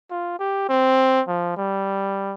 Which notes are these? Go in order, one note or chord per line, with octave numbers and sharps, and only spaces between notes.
F4
G4
C4
F3
G3